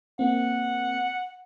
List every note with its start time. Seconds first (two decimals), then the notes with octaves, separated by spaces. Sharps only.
0.19 A#3 C4 F#5